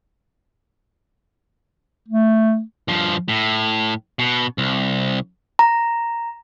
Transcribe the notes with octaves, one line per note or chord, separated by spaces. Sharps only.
A3
G2 F3
A2
B2
C2
A#5